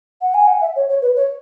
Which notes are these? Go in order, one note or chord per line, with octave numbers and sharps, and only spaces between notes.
F#5
G#5
F#5
E5
C#5
C#5
B4
C#5